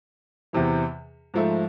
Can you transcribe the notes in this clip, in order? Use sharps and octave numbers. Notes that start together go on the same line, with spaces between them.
E2 C3 E3
G#2 F3 A3